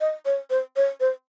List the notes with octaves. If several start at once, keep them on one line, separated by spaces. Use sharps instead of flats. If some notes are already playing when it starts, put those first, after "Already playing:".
D#5
C#5
C5
C#5
C5